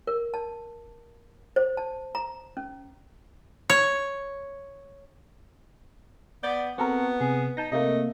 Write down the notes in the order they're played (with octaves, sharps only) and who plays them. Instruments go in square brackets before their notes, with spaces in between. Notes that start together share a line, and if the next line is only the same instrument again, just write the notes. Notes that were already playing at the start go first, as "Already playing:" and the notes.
[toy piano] A#4
A5
C5
A5
A#5
C#4
[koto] C#5
[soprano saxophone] B3 [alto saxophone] D5 [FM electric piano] G6
[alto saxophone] B3 [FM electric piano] C4 A4 A#4 [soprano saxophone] F#4
[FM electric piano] C3 [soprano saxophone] G#4
[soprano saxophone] D#4 [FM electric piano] A5 G6 A#6
[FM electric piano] C3 A#3 [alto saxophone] A3 [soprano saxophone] D#5